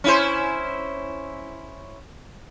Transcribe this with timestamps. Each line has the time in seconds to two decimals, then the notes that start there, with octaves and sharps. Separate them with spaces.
0.04 C#4 E4 C5